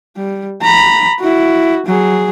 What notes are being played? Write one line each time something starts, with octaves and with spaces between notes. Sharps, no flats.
G3
A#5 B5
E4 F#4
F#3 G#4